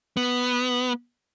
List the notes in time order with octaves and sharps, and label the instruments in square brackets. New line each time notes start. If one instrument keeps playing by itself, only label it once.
[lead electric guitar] B3